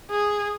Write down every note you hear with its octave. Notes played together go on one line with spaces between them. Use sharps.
G#4